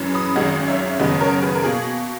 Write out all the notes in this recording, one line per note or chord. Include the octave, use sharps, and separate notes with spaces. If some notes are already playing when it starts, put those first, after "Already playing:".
Already playing: F#2 E3 G#3
B5 D#6
G#1 F#2 D#3 G#3 D#5 F#5
C#5 E5
F#1 F#2 D#3 G#3 B3 B4 D#5
A#4 C#5
G#4 B4
A#4
B2 A#3 G#4